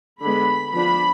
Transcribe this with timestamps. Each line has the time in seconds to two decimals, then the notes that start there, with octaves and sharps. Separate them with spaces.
0.22 D3 G#3 B3 B5
0.73 F3 B3 D4 B5